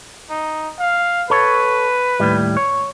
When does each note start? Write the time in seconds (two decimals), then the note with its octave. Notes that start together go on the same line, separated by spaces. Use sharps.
0.30 D#4
0.79 F5
1.30 A4 B4 C#5
2.20 D#2 A2 G3
2.57 C#5